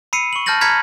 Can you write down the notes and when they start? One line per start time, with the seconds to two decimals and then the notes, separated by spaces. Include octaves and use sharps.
0.13 B5 E6 C7 C#7 D#7
0.33 C#6 F#7
0.46 A5 F6 G6 A6 A#6 F#7
0.61 A#5 B5 F6 G#6 B6 C#7